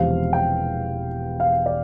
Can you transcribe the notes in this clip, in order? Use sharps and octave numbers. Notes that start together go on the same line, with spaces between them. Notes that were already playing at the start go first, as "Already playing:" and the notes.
Already playing: E1 E2 C3 F3 C4 F5
G5
F5
D5